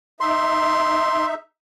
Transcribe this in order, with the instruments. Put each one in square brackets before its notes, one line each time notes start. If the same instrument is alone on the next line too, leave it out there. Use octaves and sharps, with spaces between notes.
[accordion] D#4 E5 [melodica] C6